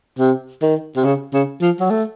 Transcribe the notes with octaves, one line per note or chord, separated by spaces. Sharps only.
C3
D#3
C3
C#3
C#3
F3
F#3
A3